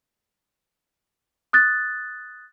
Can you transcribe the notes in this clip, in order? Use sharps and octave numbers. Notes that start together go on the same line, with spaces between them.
D#6 F#6 A6